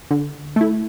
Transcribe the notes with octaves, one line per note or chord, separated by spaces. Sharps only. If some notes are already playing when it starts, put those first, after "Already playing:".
D3
A3 E4